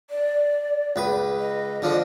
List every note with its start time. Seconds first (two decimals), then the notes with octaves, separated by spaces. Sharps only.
0.10 D5
0.96 C#2 B4
1.39 D#5
1.82 D3 F3